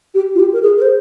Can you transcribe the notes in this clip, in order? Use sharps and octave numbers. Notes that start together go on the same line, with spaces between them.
G4
F4
G4
A#4
G#4
A#4
C5